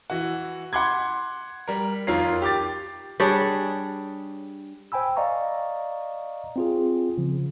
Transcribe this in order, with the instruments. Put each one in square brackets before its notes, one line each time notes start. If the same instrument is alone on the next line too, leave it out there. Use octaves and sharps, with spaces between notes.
[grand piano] E3 F#4
F#5 B5 C6 D6 G#6
G3 A#4
F2 D#3 F4 A#4 C#5 C7
G4 D6 A6
[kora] G3 D4 G#4 C#5
[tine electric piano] C5 G5 G#5 B5 E6
D5 D#5 F5 A#5 C#6
C4 F4 G#4
C#3 F3